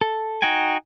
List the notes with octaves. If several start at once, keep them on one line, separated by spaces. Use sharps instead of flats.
A4
D#4 F#4 G5 G#5